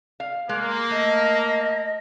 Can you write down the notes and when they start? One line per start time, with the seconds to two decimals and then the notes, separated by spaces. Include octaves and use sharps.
0.20 F5
0.49 G#3 A#3
0.91 A3 D#5